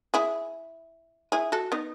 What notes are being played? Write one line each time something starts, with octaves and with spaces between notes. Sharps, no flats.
E4 G#4
E4 G#4
F#4 A4
B3 D#4